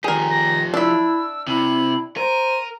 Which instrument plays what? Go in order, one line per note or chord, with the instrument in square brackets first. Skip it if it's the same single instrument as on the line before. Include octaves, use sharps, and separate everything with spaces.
[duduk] D#3 [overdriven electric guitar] F3 G4 [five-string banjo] G#4 A#4
[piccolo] A#6
[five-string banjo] D4 E5 [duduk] E4 [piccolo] E6
[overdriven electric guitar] C3 [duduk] E4 [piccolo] F#7
[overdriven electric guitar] A#4 [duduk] C5 [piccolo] D#7